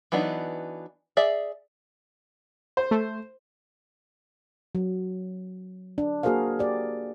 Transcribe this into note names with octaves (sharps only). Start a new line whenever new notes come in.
E3 F#3 B3 D4 D#4
G#4 D5 E5
C5
A3
F#3
D4
A#3 F#4 G#4 A#4 C5 F5
G4 D5